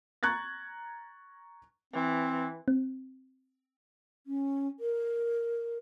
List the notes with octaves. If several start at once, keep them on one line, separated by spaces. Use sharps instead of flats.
A#5 C#6 F#6 G#6 A6
E3 C4
C4
C#4
A#4